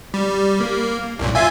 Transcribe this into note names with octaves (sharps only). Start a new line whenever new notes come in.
G3
A#3
C2 F#2 A#2
F4 E5 G#5